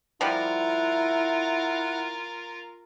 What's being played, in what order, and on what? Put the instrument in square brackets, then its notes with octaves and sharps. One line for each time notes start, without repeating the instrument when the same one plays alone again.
[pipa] F3 G3 [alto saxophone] E4 [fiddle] F4 A#4 [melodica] F#5